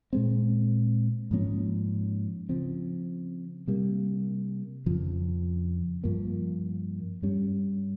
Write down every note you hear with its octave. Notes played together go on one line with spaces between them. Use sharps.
A#2 G#3 C4
G#2 F3 A#3 C#4
C#3 F3 C4
C3 G3 A#3
F2 C#3 F3
G2 F3 A#3
G2 G3 C#4